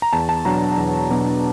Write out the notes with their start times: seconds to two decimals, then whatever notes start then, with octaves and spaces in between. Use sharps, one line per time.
0.02 A#5
0.13 E2 A5
0.29 A5
0.45 B2 F#3 B3 D4 A#5
0.78 E2
1.10 B2 F#3 B3 D4